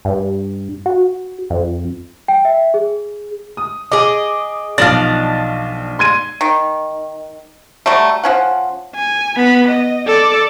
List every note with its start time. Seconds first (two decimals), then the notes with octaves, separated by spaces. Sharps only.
0.05 G2
0.86 F#4
1.50 F2
2.28 G5
2.45 E5
2.74 G#4
3.57 D#6
3.92 G#4 D#5 D6
4.78 B1 F3 D4 D#5 F5 A6
5.99 C6 G#6 D#7
6.41 D#3
7.86 F#3 G3 A3
8.24 F3 C#4 F#5
8.96 G#5
9.37 B3 B5
9.69 D#5
10.07 A4 D5